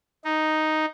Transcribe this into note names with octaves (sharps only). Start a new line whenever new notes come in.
D#4